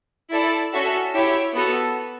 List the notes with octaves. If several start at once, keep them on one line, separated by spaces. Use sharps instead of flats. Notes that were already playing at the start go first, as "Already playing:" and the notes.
E4 A4 D5 A5
C#4 F#4 A4 E5
E4 G4 C#5 E5
B3 F#4 A4